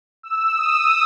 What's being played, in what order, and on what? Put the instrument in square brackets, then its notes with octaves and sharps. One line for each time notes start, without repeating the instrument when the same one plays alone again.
[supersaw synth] E6
D#6